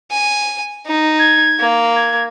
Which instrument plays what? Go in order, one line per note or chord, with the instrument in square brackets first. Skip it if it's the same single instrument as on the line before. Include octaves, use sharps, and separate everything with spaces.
[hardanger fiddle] G#5
D#4
[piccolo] G#6
[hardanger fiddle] A#3
[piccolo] G#6